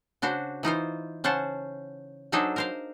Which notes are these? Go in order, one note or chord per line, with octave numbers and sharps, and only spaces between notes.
C#3 D4 F#4 C5
E3 D#4 F4 C5
C#3 C#4 C5 F#5 A5
F#3 D4 D#4 G#4 A4 C5
A#4 C5 F5